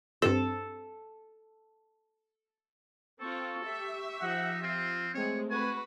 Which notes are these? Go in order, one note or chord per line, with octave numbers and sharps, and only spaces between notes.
G2 C4 A4
C4 F4 A4 C#6
G4 E5
F3 D#4 F#5
C4 F4
G#3 A3 C4 G#4 C#5
F#4 B4 G#5